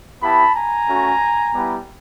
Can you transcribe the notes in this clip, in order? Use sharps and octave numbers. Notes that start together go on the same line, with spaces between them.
B3 E4 G4 A5 B5
G#5 A#5
A3 C#4 F#4
G3 B3 E4 G4